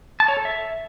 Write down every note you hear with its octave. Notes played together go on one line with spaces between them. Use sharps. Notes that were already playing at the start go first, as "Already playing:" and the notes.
A5
C#5
A4
E5